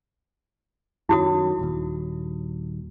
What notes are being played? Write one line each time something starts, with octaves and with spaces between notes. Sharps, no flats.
F#2 D#3 F#3 E4 F#4 D#6
D#1 D#2